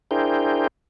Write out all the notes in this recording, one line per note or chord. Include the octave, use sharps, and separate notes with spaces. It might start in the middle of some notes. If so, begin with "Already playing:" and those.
D4 E4 G#4 A#4 C5 G5